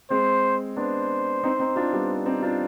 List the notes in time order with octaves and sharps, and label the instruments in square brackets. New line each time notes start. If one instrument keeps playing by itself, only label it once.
[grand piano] G#3 C4 [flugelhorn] C5
[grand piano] B3 D4 [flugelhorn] C5
[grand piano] C4 D#4
C4 D#4
D4 F4
G3 B3
C4 D#4
D4 F4